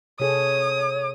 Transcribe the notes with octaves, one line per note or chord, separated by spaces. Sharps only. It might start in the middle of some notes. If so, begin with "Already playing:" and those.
C3 G#4 A4 C#5 D#6